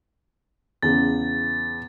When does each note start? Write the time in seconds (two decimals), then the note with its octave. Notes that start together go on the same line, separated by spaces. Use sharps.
0.83 E2 C#3 A6